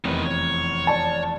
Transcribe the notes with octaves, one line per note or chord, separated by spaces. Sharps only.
F1 E2 D#3 C4 B4
C#5
D5 A5